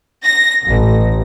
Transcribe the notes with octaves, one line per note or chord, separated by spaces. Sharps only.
A#6
A1